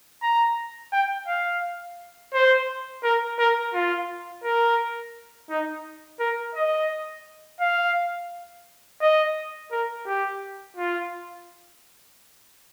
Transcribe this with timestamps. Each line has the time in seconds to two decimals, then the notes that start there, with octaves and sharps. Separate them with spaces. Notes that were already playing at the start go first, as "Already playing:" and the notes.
0.22 A#5
0.92 G5
1.28 F5
2.33 C5
3.03 A#4
3.39 A#4
3.74 F4
4.44 A#4
5.49 D#4
6.20 A#4
6.55 D#5
7.61 F5
9.01 D#5
9.72 A#4
10.06 G4
10.77 F4